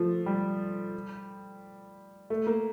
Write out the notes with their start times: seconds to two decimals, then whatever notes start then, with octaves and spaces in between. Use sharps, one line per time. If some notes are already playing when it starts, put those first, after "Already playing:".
Already playing: F3 A3
0.26 G3
2.30 A3
2.47 A#3